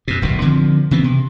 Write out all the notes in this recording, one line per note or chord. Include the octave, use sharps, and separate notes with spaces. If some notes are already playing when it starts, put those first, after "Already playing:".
F#2 B2
D1 B1 B2
D3 D#3 F3 C4
C#3 E3 B3 C4
C3